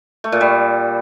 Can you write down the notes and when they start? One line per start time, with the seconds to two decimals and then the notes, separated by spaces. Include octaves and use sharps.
0.24 A3
0.32 A#2
0.41 G3